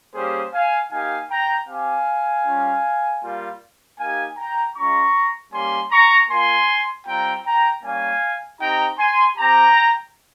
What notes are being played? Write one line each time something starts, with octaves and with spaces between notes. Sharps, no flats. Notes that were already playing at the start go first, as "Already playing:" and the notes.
G3 A#3 C#4 G4 G#4 C5
F5 G#5
A#3 D#4 G4 F5 G#5
G5 A#5
C4 G4 F5 G#5
G3 C#4 F4
G3 A#3 F4
A#3 D#4 G4 F5 G#5
G5 A#5
G#3 C#4 F4 A#5 C#6
G3 A#3 C#4 G4 G#5 C6
A#5 C#6
A#3 F4 G#5 C6
G3 C4 F4 G5 A#5
G5 A#5
G3 A#3 C#4 F5 G#5
C4 D#4 G4 G5 A#5
G#5 C6
C4 G4 G5 A#5